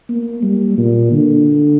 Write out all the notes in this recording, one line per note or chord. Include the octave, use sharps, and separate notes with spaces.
A#3
G3
A#2
D3